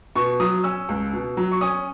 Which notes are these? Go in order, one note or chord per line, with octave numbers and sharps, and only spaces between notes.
B2 C#6
F#3 D#6
C#4 E6
C#2
B2
F#3
C#6
C#4 D#6